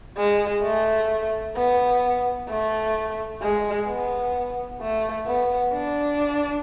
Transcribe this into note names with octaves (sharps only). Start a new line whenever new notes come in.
G#3
A3
B3
A3
G#3
B3
A3
B3
D4